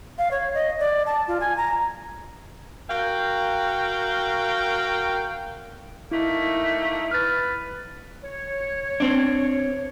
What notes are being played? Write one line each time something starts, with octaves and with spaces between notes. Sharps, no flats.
F5
C#5
D#5
D5
A5
F4
G#5
A#5
F#4 A#4 F5 G5
A3 A#3 D#4 E4
B4 F6 A6
C#5
C4 D4